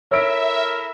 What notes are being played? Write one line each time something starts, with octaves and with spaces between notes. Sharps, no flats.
E4 A4 A#4 C#5 E5 D7